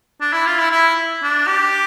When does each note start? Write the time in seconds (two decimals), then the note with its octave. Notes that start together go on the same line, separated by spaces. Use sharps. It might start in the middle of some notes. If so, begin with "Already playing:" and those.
0.21 D4
0.33 E4
0.47 F4
0.58 E4
0.71 E4
1.23 D4
1.48 G4